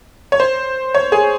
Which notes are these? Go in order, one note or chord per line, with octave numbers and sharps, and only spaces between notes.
C#5
C5
C#5
G#4